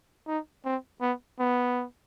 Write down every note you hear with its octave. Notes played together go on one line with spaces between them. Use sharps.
D#4
C4
B3
B3